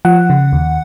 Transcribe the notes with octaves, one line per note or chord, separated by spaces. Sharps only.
F3 F#5
C#3
D#2